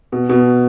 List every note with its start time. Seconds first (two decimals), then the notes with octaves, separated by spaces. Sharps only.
0.12 B2
0.29 B2